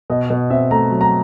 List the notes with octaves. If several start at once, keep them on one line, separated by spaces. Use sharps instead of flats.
B2 D#5
B2
C4 E5
A3 A#5
F#3
A#5